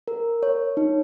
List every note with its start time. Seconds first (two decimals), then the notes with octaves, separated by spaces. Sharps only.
0.08 A#4
0.43 C#5
0.77 D#4